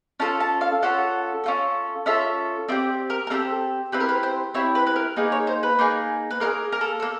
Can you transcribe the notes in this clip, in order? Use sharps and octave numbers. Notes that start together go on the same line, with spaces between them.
C#4 F4 A4 A5
A5
F5
C#4 F4 A4 F#5
C#4 F4 A4
C#4 F4 A4 E5
C4 E4 G4 D5
A#4
A#4
C4 E4 G4 A4
C4 E4 G4 B4
A#4
B4
C5
C4 E4 G4 C#5
B4
B4
A#4
A#3 D#4 G#4 B4
C#5
C5
B4
A#3 D#4 G#4
B4
A#3 D#4 G#4 A#4
A#4
A4
A#3 A4